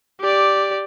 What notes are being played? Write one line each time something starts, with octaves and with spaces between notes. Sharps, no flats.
G4 D5